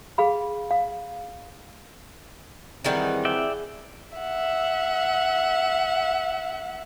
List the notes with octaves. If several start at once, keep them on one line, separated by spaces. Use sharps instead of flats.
G#4 F5 B5
F5
D#3 E3 G3 C4 D#4 E4 G#4 F#5
D5 E5 G5
E5 F#5